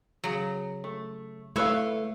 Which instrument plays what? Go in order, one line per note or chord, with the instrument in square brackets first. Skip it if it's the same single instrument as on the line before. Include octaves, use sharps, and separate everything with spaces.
[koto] C#3 F#3
[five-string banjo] A3
[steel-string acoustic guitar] A3 [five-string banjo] E4 B4 F5 [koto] C#5 E5